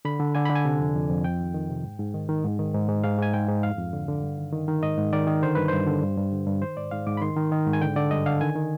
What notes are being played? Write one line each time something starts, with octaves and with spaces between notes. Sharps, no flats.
D3 B5
D3
D3 G#5
D3 B5
G#5
C3
F2
F2
F2
F2 G5
D#3
D#3
C3
G#2
G#2
D#3
D#3
G#2
D#3
G#2
G#2
G#2 F5
G#2 G#5
G#2 G5
G#2
F2 F5
F2
D3
D3
G2
D#3
D#3
D#3
G#2 D#5
G#2
D#3 D5
D#3
D3 C5
G2 B4
G2 C5
D3
G2
G2
D3
G2
D#3 C5
G#2 D5
G#2 F5
G#2 D6
B5
D#3 C6
D#3
D#3
G#2
G#5
D3 G5
D3 D5
G2 D#5
D3 F5
D#3 G#5
D#3